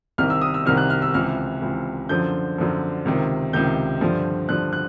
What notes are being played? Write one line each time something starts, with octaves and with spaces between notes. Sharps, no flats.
C2 C3 D#3 F6
E6
D#6
E6
C2 C3 D#3 F6
F#6
F6
E6
C#2 C3 E3 F6
C#2 C3 E3
F#2 D3 F3 G6
F#2 D3 F3
C#2 C3 D#3
C#2 C3 D#3 G6
G2 D3 F3
G2 D3 F3 F#6
F#6